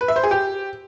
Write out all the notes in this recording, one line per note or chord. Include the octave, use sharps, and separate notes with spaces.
B4
E5
C5
G#4
G4